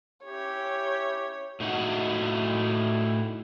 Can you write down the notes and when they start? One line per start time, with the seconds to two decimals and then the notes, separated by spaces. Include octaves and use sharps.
0.25 C#4 E4 G4 C#5
1.60 A2 D#4 E4 F#4 F#5